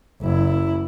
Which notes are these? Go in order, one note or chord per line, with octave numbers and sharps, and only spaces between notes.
F#1 E4